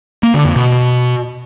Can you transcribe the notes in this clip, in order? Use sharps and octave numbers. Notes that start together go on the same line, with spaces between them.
A#3
D3
F2
B2